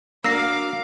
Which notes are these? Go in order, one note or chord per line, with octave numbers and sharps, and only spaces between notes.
A#3 D4 F#4 F5 D6 E6 A#6 C7